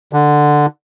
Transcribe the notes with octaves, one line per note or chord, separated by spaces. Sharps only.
D3